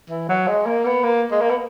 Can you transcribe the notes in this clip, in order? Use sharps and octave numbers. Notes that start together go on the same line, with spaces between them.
E3
F#3
G#3
A#3
B3
A#3
G#3
A#3
B3